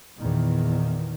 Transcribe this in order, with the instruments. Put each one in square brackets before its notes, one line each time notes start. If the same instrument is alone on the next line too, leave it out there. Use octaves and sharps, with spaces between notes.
[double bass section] E2 A#2 D#3